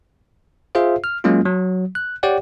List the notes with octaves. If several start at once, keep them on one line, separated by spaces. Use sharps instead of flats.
F4 G#4 C5 E5 F5
F6
F#3 G#3 A#3 C#4 F4
F#3
F#6
G4 C#5 D5 F#5 G5